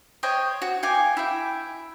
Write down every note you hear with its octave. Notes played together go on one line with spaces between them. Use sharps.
C5 C#5 D#5 G5
F#4
F5 G5 G#5 D6
E4 G5